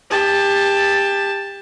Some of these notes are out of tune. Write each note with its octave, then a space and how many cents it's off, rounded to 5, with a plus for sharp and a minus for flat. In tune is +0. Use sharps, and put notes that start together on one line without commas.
G4 +25 A5 +0